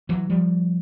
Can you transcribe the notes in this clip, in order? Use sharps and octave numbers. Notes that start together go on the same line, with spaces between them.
E3 F#3
F3 G3